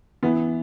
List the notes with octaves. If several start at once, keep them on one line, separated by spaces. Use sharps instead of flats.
E3 B3